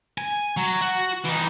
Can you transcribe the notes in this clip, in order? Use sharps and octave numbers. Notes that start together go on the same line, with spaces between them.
G#5
F#3
F#4
E3 D#4